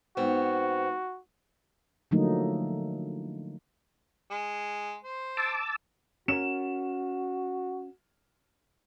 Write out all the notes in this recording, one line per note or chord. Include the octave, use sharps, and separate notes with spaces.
G#2 B3 C4 F#4
D3 F3 F#3 A3 A#3 D#4
G#3
C5
A5 D6 E6
C#4 F#4 A#4 E7